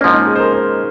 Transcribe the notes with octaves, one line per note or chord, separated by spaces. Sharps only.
G#2 F3 A#3 C#4
D#4
G#4
C5
A#4
C5